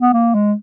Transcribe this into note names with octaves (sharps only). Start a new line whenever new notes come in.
B3
A#3
G#3